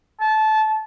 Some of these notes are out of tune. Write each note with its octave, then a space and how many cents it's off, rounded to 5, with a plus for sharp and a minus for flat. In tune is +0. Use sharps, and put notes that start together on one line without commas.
A5 -20